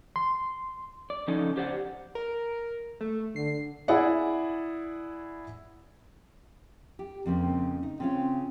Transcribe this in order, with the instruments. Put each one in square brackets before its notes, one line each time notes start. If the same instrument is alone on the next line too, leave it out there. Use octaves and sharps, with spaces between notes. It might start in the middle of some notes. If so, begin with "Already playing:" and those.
[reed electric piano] C6
[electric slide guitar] D5
C#3 F3 C#4 D#4 A4
G4 C5 D5 F#5
[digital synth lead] A#4
A3
[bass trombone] D3 [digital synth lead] C7
[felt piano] E4 G#4 D5 F#5
[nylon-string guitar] G4
[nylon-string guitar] F2 C#3 A#3 [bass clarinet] C4
[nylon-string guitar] D#4
[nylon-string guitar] C#3 C#4 F4 [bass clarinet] C4